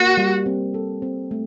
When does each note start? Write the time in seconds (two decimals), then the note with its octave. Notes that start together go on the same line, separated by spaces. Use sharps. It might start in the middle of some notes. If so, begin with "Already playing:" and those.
Already playing: A#3 F#4
0.17 G3
0.46 C4
0.74 A4
1.02 C4
1.31 A3